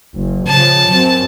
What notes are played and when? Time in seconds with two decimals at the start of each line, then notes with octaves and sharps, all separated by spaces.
0.16 F#1
0.48 C#3 F3 A5
0.91 F#2 C4